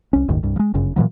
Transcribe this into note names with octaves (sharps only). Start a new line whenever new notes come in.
C2 C#4
F#1 D2 G#2 D#3
C2 G2
F3 G#3
G1 F#2 C#3
A#2 C#3 E3 F#3